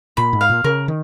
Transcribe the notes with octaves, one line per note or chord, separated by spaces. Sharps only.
A#2 B5
G#2
F5
A#2
C#3 A#4
D#3